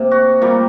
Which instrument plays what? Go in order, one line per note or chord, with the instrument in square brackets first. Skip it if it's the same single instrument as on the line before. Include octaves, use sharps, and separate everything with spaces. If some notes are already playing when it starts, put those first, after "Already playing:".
Already playing: [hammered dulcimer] C3 A#3
F#4
A#2 G3 A#3 G4